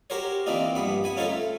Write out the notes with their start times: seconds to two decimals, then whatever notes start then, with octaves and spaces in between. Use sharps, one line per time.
0.10 F#4 G4 A#4 C5 C#5
0.46 E3 A#3 C4 D4 D#4 F4
0.75 A#1 G2 B3 B5
1.04 B3 G#5 B5
1.17 C#4 D#4 F4 G#4 A4 C5
1.28 A3